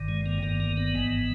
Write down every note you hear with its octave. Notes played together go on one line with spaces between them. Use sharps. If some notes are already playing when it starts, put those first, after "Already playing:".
Already playing: G1 G2 D#3
G#3
A#3
G1 G2 D#3 A#3
A#3
B3
G#1 G#2 E3